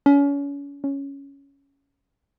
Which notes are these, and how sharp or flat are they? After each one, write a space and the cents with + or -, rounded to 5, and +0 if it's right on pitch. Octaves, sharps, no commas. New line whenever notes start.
C#4 +35
C#4 +5